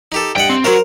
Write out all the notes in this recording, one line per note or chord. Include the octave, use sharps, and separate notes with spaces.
D#4 G4 A4
G2 D#5 F#5 G5
C4
F#3 F#4 A#4 C5 A#5